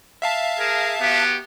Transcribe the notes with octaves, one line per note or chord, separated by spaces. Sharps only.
E5 F5 A5
G#4 A#4
B3 F#4 G4